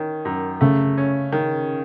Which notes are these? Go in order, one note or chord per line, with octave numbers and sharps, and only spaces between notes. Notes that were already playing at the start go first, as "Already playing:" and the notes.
Already playing: D#3 C#4
F#2
C#3 A3
C#4
D#3